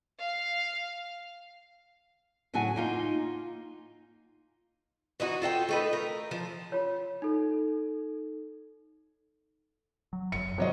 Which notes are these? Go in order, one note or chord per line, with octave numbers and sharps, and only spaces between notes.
F5
A2 C#3 F#3 F#4 G#5
A#3 D#4 F4
E3 D#4 E4 F#4
F4 A4 F#5 G5
A3 D#4 B4
A#4
F3
F4 C#5
D#4 A4
F#3
F#1 F#2 C#7
G#1 C3 F#3 D#5